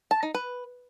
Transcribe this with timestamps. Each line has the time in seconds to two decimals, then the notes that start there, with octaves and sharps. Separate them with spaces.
0.11 A5
0.23 D#4
0.34 B4